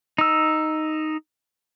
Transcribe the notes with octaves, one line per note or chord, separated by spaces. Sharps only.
D#4 E6